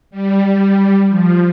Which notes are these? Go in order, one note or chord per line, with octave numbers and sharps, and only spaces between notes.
G3
F3